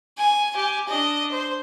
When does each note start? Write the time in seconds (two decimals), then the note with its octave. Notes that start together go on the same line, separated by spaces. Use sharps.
0.17 G#5
0.56 G4 G#5
0.88 D4 D#5
1.31 C5